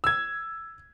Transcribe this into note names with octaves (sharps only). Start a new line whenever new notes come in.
E6 G#6